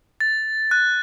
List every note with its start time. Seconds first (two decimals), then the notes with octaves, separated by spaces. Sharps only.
0.20 A6
0.71 F#6